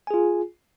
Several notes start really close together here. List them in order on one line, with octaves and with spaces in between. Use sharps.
G#5 G#4 F4